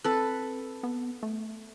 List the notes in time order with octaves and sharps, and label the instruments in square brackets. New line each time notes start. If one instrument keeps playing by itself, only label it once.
[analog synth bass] C4 [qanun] A4 B4
[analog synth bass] B3
A3